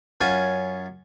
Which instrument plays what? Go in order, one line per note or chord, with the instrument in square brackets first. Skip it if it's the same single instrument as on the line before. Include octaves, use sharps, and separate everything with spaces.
[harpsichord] F#2 C#4 F4 G#5